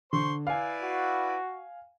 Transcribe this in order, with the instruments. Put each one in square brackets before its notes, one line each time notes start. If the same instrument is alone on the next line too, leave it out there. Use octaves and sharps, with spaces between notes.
[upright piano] D3 [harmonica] C5 C6 C#6
[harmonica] E4 B4 D5 [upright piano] F5 G#5
[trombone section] F#4